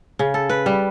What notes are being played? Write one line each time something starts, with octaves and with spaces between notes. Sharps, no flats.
C#3
A4
B4
G3